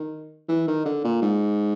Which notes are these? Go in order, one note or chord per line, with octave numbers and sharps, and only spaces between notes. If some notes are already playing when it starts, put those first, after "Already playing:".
Already playing: D#3
E3
D#3
D3
A#2
G#2